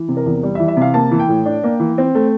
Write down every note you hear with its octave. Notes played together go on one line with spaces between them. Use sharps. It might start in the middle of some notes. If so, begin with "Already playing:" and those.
Already playing: E3
C3
A#4
E2
G3
E5
E3
E5
C3 F5
A#3 A5
E3
G5
A2
D4
A#3
E3
C4
A3